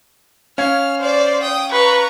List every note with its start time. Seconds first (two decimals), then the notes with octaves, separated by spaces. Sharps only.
0.58 C#4 F5 F6 G#6
1.00 C5 D5
1.42 G5 D#6
1.71 B4 A#5 C#6